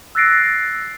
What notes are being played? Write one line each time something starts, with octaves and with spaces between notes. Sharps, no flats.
E6 F#6 A6 A#6 C7 D7